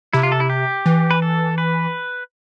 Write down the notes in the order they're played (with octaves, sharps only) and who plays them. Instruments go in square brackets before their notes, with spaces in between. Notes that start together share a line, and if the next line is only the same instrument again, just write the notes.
[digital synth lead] C3 [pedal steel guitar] E4
[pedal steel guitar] F4
A4
E4
G4
[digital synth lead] E3
[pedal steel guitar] B4
A4
B4